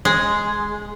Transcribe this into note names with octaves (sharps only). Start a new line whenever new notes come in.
G#3